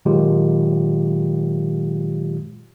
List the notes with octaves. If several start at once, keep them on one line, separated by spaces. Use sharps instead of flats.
A#2 D#3 F#3 G#3 F4 G4